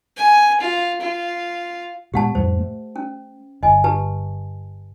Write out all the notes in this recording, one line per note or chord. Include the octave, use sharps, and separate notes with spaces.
G#5
F4
F4
A#2 G#3 B3 G4 F#5 A5
F2 A2 G3 C5
A3
C#4
G1 D#5 G#5
G4 B4 A5